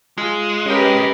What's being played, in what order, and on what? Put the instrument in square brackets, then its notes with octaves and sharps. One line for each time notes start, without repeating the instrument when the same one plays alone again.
[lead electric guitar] G#3 [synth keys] F4
[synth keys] C#4 D#5 G5 [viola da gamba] G4 A#4 B4